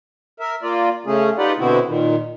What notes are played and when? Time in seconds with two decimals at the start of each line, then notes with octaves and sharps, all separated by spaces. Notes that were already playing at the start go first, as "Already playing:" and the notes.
0.40 A#4 E5
0.63 A#3 F4 D5
1.06 C#3 A3 C#4 G#4
1.38 D#4 F4 G4 B4 D5 F#5
1.59 B2 D3 B3 C4 E4 F#4
1.87 A#2 D#3